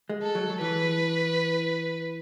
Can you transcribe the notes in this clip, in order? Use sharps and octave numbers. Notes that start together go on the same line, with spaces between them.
G#3
A4
F#3
F#3
E3 B4